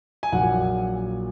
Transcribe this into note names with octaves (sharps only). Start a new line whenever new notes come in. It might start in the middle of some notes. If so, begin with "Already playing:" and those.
G#5
A#1 A#2 F#3 F#5